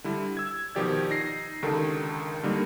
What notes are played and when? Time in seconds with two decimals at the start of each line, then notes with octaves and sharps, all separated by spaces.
0.04 D3 G3 E4
0.37 E6 G#6
0.75 B2 D#3 F3 G4 D5 G#6
1.10 D#4 A#6 C7
1.63 C#2 D3 D#3 G4 A4
2.43 D3 G3 A#3 D#4